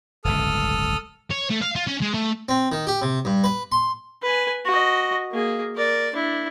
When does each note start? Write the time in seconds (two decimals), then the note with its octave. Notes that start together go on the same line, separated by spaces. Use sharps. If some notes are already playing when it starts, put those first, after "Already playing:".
0.25 D1 G1 C#2 A4 D#6 F6
1.31 C#5
1.50 A3
1.62 F5
1.76 F4
1.87 C#4
2.02 G#3
2.14 A3
2.49 C4
2.72 D#3
2.87 G4
3.02 C3
3.25 G2
3.44 B4
3.72 C6
4.22 B4 G#5
4.65 F#4 D#5
5.31 A#3 G#4
5.75 A#4 D5
6.13 D4 E4